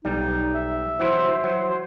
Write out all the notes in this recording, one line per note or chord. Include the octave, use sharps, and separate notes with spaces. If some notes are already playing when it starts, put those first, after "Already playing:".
B1 G3 D#4
E5
E3 F#3 E4 C5
F#3 C5